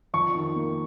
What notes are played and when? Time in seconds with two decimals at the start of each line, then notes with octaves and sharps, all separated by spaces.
0.14 F2 C#6
0.35 D#3
0.56 A#3